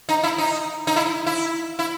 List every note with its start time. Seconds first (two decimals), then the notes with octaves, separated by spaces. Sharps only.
0.09 D#4
0.24 E4
0.38 D#4
0.87 D#4
0.96 E4
1.26 E4
1.79 E4